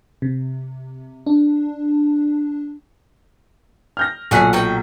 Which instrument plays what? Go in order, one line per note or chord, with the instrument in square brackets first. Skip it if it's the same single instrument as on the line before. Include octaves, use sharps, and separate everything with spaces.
[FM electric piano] C3
D4
[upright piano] F6 G6 A#6
[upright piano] B1 A#2 B6 [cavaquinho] F#4 G#4 F#5
[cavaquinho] D#4 F#4 G5